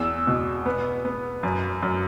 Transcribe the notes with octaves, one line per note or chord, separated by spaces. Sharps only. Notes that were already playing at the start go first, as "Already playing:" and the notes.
Already playing: E2 E6
B2
B3
B3
F#2
F#2